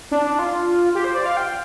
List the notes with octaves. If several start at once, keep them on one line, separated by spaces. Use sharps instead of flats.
D4
D4
F4
G4
C5
D5
F5
G5